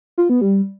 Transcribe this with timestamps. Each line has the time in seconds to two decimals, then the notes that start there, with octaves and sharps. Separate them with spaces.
0.18 F4
0.29 B3
0.41 G3